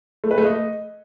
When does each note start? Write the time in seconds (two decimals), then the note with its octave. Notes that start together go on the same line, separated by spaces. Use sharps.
0.24 A3
0.31 B4
0.38 A3
0.45 D#5